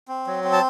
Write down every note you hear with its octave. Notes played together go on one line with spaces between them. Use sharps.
C4
F#3
C4
A5